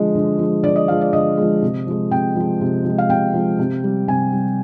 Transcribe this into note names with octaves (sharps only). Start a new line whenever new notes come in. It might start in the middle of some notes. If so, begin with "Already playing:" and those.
Already playing: D3 F3 G#3 D#5
D3
F3 G#3
D3 D5
D#5
F3 G#3 F5
D5
D3 D#5
F3 G#3
C3
F3 G#3
C3 G5
F3 G#3
C3
F3
G#3
F5
C3 G5
F3 G#3
C3
G3
C3 G#5
G3